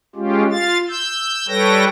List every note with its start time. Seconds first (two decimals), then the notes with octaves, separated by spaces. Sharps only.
0.16 G#3 C#4 F4 G4
0.51 F4 F5 A6
0.89 E6 G6
1.48 G3 A4 B4 C#5 G5 A#6